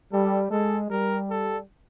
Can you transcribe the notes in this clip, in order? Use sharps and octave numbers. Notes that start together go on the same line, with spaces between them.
G3 A4
G#3 A4
G3 A#4
A4